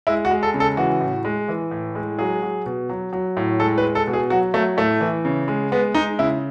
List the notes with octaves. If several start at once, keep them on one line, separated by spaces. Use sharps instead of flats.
G#3 E4
F#4
G#3
A4
C#3
A4
E3 F#4
A2
G#3
E3
A2
G#3
F#3 G#4
F#3
B2
F#3
F#3
A2
G#3 A4
B4
G#3
A4
B2
G#4
F#3 F#4
F#3 A3
A2 A3
E3
C#3
G#3
G#3 B3
G#3 D#4
C#3 E4